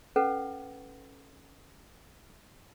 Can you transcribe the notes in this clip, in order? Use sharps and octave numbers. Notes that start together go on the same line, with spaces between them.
C#4 A4 B4 F#5